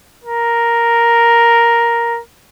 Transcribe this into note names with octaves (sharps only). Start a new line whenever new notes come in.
A#4